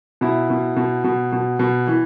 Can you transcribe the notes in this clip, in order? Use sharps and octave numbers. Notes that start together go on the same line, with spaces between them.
B2 E4
B2
B2
B2
B2
B2
E3